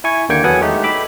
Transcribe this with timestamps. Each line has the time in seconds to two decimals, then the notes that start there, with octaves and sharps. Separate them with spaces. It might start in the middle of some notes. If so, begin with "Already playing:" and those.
0.04 E4 G#5 C#6
0.29 D#2 D3 A#3 G5 G#6 C#7
0.44 E2 F#3 B3 A4 F#5 G#5
0.61 G#3 A3 D#4 G4
0.84 B5 D6 E6